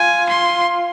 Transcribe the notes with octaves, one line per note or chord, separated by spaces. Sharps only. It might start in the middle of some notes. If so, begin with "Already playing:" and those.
Already playing: F4 G#5
C6